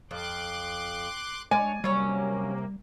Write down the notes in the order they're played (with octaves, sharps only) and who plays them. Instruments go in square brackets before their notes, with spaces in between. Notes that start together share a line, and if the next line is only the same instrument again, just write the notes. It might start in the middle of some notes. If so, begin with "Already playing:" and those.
[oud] F2 [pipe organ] C6 D6 F#6
[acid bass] G#3 [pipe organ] D4 C#5 [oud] D5 [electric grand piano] G#5
[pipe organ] C3 A#3 [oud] F#3 C#4 [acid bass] G3